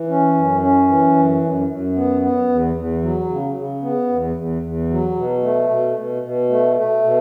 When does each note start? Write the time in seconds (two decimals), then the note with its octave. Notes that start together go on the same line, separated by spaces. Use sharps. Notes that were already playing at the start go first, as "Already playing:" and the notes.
Already playing: E3
0.09 C#4
0.34 F#2
0.61 C#4
0.88 E3
1.16 F#2
1.42 F#2
1.68 F#2
1.95 B3
2.22 B3
2.49 E2
2.75 E2
3.03 F#3
3.29 C#3
3.56 C#3
3.82 B3
4.09 E2
4.36 E2
4.62 E2
4.90 F#3
5.16 B2
5.42 A3
5.69 B2
5.97 B2
6.23 B2
6.49 A3
6.76 A3
7.04 B2